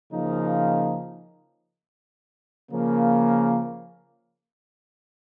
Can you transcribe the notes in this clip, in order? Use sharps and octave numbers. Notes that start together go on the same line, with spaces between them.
C#3 F3 A#3 D#4
C#3 F3 A#3